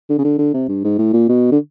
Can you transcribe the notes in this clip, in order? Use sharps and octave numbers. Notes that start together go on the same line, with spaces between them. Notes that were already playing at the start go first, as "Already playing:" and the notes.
D3
C#3
D3
D3
C3
G2
G#2
A2
A#2
B2
D3